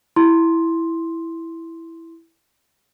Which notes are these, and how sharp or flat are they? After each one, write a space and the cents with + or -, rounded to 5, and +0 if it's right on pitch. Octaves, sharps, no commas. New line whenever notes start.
E4 +0 C6 +5